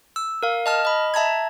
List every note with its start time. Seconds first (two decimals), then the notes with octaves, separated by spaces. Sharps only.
0.16 E6
0.43 A#4 F5
0.66 D#5 A5 F6
0.85 D#5 B5
1.14 E5 A5 A#5 G#6